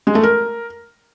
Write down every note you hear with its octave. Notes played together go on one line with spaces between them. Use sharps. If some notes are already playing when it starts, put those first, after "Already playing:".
G#3
A3
A#4